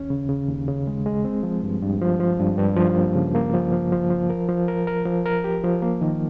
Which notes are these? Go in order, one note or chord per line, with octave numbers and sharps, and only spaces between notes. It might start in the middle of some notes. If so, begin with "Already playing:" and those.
Already playing: D#2 C#4
C#3
C#3
D#2
C#3
G#3
G#3
C4
F3
G2
G2
F3
F3
G2
G2
F3
A#3
C#3
A#3
F3
F3
F3
F3
A#4
F3
A#4
A#4
F3
A#4
G4
F3
A#3
D#3